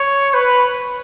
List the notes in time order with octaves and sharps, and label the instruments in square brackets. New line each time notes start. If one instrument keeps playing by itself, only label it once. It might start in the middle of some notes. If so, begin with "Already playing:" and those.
Already playing: [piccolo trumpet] C#5
B4